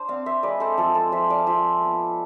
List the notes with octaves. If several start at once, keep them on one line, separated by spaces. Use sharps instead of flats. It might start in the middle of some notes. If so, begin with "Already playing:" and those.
Already playing: D4 C5
C4 D5 F5
C5 E5
G#3 B4 D5
A4 C5
F3 A4 C5
A4 C5
F3 C5 E5
D5 F5
F4 C5 E5
B3